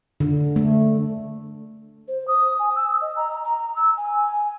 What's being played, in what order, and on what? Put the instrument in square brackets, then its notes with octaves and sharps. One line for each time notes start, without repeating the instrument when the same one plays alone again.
[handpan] D3
A3
[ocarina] C5
D#6
G#5
E6
D#5
A#5
A#5
E6
G#5